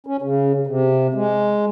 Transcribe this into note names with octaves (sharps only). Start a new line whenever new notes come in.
C#4
C#3
C3
G#3